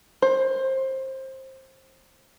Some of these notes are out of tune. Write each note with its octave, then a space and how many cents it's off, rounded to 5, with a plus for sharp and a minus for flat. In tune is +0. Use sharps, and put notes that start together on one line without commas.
C5 +20